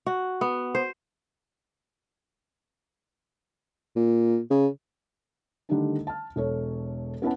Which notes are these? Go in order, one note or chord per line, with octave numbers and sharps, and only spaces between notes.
F#4
B3
C5
A#2
C#3
D3 D#3 G3 A3 D4 D#4
A5 F6
E1 A4 C#5
B3 C#4 E4 B4 F#5 A5